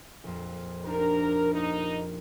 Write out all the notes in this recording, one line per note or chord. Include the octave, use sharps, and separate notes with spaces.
A#1 F2
D4 D#4 G4 A#4
A#3 D#4 A#4